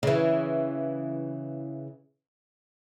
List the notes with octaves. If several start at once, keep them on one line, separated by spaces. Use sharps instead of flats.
C#3 E3